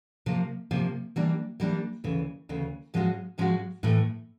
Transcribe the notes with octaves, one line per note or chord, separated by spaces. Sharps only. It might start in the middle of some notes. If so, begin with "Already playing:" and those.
C3 F3 A#3
C3 F3 A#3
E3 G3 A#3 D4
E3 G3 A#3 D4
D2 C#3 E3
D2 C#3 E3
G#2 F3 G#3 C#4 F#4
G#2 F3 G#3 C#4 F#4
A2 E3 A3